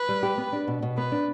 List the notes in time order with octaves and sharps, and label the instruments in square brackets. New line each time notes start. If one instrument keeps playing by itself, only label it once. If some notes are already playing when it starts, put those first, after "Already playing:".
Already playing: [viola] B4
[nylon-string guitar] G3
G4
B3
D4
B2
B2
[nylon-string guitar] B3 [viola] B4
[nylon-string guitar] D4